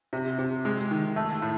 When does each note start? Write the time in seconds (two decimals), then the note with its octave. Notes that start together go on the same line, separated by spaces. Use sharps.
0.13 C3
0.38 C3
0.65 G#3
0.91 D#3
1.16 A3
1.42 A2